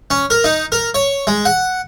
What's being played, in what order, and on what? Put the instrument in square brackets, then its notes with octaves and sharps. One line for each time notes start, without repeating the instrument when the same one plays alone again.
[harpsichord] C#4
A#4
D#4
A#4
C#5
G#3
F#5